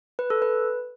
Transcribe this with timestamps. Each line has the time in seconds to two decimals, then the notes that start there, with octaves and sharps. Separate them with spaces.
0.19 B4
0.30 A4
0.42 B4